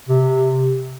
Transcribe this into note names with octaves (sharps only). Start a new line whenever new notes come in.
C3